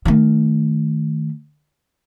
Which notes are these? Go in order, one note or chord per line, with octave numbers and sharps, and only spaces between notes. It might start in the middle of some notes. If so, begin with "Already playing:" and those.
D#3 A3